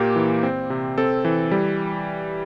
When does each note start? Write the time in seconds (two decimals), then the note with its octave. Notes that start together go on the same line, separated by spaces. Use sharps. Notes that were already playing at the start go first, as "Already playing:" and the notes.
Already playing: A#2 A#3 G4
0.16 E3
0.43 C4
0.70 C3
0.98 C4 A4
1.25 E3
1.51 G3